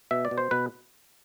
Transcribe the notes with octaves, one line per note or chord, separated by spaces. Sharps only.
B2 E5
D5
B2
C5
B2 B4